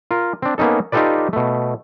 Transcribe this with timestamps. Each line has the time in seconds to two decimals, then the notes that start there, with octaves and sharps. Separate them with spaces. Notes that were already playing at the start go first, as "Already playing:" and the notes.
0.11 F4 A#4
0.42 C4 D4
0.58 A#3 B3 C#4 D#4 A4
0.92 D#4 F4 G4 A4 B4 D5
1.33 B2 A3